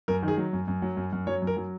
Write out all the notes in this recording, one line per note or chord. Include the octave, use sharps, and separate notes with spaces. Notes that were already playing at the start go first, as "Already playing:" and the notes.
F#2 A#4
D#3
G#4
F#3
F#2
F#2
F#3
F#2
F#2
F#3 C#5
F#2
A#4
F#3